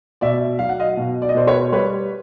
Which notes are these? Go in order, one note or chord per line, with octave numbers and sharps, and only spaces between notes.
B2 D5 E5
F#3 F5
F#5
D#5 F5
B2
D5
D#5
B2 C5 D5
B4 C#5
G3 B4 C#5